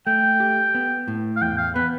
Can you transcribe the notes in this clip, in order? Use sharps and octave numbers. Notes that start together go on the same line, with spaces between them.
A3 G5
G4
B3
A2
F5
E2 G5
F5
B3 B4